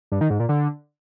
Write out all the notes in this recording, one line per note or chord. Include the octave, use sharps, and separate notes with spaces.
G2
D#3
G#2
A#2
D3